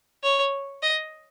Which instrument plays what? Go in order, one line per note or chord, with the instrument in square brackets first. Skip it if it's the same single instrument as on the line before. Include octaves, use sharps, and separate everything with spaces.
[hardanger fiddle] C#5
D#5